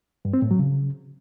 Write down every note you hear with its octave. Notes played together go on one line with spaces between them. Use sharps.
G2
C4
A2
F#3
C#3